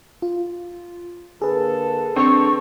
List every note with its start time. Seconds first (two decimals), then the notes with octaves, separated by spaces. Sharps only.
0.22 F4
1.42 D3 A#3 G#4 A4 B4
2.16 C4 D4 A4 C#6